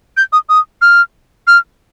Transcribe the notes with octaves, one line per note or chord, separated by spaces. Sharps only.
G6
D#6
D#6
F6
F6